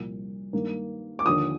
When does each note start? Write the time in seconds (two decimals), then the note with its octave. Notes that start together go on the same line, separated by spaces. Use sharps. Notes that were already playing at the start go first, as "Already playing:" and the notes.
Already playing: C2 A#2 F3
0.53 G2 D#3 A#3
1.19 D6
1.25 D#2 D3 F3 D#6